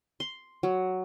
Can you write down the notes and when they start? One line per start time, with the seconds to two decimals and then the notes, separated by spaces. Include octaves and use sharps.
0.20 C6
0.63 F#3